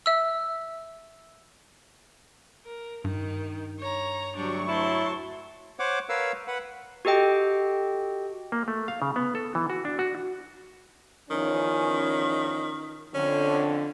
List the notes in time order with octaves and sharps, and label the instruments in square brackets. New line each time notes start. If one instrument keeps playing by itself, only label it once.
[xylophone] E5 E6
[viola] A#4
[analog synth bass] G2 [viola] D#3
[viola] C#5 A#5
[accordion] D2 F#3 C#6 [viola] G3 D4
[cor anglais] E4 [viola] A5 C6
[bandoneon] C5 C#5 F#5 D6
A#4 B4 C#5 F5 E6
B4 F#5
[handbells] F#4 G4 A4 D#5 G5
[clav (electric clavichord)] A#3
A3
F5
C#3
B3
A4
E3
F#4
D4
F#4
[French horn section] E2 F3 C#4 [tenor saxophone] D#3
[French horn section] F2 D3 [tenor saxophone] C#4